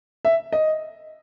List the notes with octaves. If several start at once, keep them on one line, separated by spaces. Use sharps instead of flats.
E5
D#5